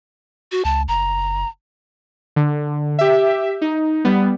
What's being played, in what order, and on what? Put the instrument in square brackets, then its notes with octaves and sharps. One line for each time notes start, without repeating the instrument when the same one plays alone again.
[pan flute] F#4
[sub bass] C#2 [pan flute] A5
[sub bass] F#1 [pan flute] A#5
[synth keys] D3
G4 E5
D#4
G3 B3